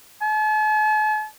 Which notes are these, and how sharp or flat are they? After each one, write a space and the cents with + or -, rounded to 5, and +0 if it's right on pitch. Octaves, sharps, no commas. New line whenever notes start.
A5 -45